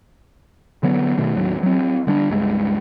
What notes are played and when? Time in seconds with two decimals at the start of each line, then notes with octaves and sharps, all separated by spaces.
0.83 D3 F#3 B3
1.18 B2 D#3 A3
1.36 D#2 A2 F#3
1.63 F#3 C4
2.07 D3 G3 D4
2.29 C#2 G2 G#3